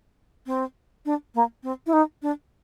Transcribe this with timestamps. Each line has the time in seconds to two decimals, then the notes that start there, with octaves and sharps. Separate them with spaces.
0.46 C4
1.05 D4
1.35 A#3
1.63 C4
1.87 E4
1.93 D#4
2.22 D4